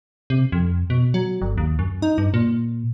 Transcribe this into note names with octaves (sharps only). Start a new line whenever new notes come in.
C3
F2
B2
F#3
G1
D#2
F#2
D#4
G2
A#2